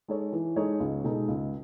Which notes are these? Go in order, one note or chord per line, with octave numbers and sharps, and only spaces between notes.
G#3 D#4 A4 C#5
E3
G#3 D#4 A4 C#5
C#2
B2 G#3 D#4 A4
C#2